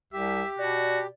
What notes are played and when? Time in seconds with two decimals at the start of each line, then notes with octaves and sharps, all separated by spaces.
0.13 C2 G4 E5
0.59 B2 F#4 D5